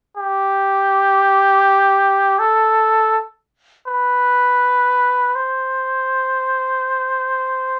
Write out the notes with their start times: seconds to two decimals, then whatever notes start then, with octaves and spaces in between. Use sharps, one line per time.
0.17 G4
2.39 A4
3.88 B4
5.36 C5